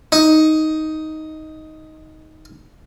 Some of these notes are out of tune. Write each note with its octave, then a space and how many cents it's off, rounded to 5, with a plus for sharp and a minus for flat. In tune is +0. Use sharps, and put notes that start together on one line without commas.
D#4 +10